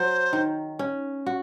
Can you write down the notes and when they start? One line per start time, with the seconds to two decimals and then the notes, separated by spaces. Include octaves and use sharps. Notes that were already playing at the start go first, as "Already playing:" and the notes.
Already playing: F#3 C5
0.33 D#3
0.79 C#4
1.26 F#4